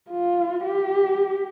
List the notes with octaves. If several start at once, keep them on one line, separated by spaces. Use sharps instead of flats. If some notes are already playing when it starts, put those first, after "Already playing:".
F4
G4